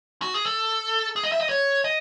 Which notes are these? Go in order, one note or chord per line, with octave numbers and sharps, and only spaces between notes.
F#4
G#4
A4
G#4
D#5
E5
D#5
C#5
D#5